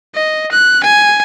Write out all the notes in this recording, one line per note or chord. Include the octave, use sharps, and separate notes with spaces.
D#5
F#6
G#5